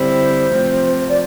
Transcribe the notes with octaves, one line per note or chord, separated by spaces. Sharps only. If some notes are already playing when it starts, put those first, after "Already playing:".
Already playing: D3 G3 C4 E4 C5
C3 F3 A3 C4
D5